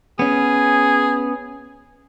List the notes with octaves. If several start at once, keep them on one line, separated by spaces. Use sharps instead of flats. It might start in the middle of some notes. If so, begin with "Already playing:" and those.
B3 C#4 G#4